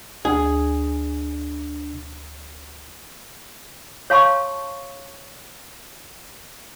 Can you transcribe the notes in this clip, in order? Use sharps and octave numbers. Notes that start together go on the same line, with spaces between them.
D2 D4 G#4
C#5 F5 A5 C6 C#6